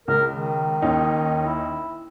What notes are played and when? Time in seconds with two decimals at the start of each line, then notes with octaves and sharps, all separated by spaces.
0.08 C#2 A#4
0.33 D#3
0.82 D#2 C#4 D#4
1.46 E4